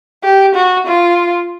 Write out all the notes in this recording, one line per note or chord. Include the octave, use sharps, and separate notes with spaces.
G4
F#4
F4